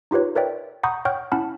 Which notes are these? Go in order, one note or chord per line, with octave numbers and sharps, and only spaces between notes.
D#4 F4 G4 B4 C#5
A#4 B4 C#5 D5 E5 G5
F#5 A#5 B5 C#6 D#6 G6
C#5 F#5 G5 C#6 F6 G6
C#4 E4 F#5 A5 B5 F6